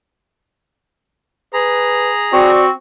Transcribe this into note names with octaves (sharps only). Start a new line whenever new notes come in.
G#4 B4 A#5
C4 F#4 D5